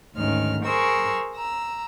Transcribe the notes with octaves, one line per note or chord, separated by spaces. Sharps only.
D2 G#2 D#3 C#4 F6
G#4 A#4 C5 C#6 E6
A#5 E6